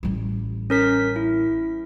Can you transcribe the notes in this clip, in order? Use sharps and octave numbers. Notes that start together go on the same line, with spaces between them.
A1 G3
C#4 A#4 B6
E4